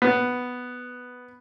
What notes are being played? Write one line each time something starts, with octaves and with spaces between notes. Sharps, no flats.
B3